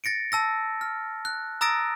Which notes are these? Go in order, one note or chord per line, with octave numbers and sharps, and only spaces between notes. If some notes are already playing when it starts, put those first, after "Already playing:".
A6 A#6 C#7 D7
A5 E6 A#6
F6
F#6
A#5 D#6 E6 A6 A#6 D7